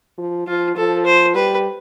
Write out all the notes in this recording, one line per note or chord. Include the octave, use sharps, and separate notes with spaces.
F3
F3 F4
F3 A4
C5
G3 B4